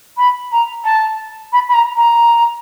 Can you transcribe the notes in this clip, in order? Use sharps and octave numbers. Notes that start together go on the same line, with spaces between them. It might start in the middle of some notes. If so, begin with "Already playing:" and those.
B5
A#5
A5
B5
B5
A#5
A#5